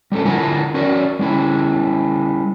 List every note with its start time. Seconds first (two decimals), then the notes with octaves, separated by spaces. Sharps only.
0.12 G3 A3 C4 C#4 A4
0.25 D3 E4 F4 A#4 F#5 G#5
0.74 C#4 F#4 A#4 D5
1.19 G3 C#4 E4